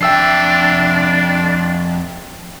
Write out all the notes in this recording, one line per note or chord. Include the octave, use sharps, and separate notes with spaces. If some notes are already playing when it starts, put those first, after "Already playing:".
F2 D4 E5 G5 E6 C7